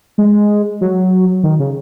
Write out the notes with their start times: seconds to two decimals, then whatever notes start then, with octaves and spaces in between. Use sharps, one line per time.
0.18 G#3
0.81 F#3
1.43 D#3
1.59 C#3